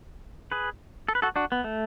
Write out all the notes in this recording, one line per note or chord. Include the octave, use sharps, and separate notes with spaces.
G#4 B4
A4
B4
F#4 A4
D4 F#4
B3
A3